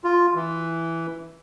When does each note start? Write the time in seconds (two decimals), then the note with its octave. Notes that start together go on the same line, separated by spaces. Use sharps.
0.04 F4
0.35 E3